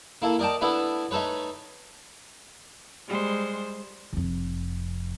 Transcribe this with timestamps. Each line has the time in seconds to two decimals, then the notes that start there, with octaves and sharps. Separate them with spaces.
0.22 A#3 E4 A4
0.39 A#4 D5 D#5 G5 A5
0.61 A3 B3 D4 E4 A4
1.11 A3 D#4 A4 B4 C#5
3.08 G3 G#3 C5
4.13 F1 F2